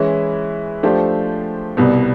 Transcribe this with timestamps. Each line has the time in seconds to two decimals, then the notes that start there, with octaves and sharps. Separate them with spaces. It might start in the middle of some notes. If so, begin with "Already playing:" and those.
Already playing: E3 G#3 C#4 E4
0.83 F3 A3 D4 G4 C5
1.77 C2 B2 G3 B3